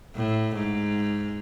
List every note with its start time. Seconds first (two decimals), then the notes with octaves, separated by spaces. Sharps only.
0.15 A2
0.55 G#2